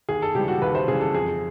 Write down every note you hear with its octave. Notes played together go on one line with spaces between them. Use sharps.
D#2 G#4
A4
C#3 E3 G3 G4
F#4
D#2 B4
C5
C#3 E3 G3 G#4
A4
F2 G#4